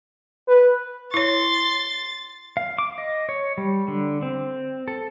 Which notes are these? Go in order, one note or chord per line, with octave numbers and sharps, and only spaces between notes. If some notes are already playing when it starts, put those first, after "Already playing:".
B4
E4 C#5 C6 A6
F5
D6
D#5
C#5
G3
D3
C4
A4